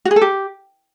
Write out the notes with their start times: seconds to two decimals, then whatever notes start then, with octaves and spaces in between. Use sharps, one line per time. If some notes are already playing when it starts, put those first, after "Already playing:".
0.05 F#4
0.11 G#4
0.16 A4
0.22 G4